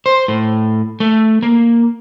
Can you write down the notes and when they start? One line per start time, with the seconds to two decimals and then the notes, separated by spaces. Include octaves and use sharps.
0.06 C5
0.28 A2
1.00 A3
1.43 A#3